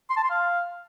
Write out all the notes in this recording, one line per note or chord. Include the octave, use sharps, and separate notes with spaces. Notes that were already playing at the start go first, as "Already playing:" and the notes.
C6
A5
C6
F5